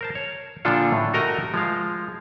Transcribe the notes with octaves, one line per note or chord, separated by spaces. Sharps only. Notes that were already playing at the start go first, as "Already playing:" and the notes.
A#4 C5 A5
C#5
A#2 D3 F3 D4 F4 A4
A2
A3 F#4 G4 A#4 D#5 A#5
F3 G#3 F5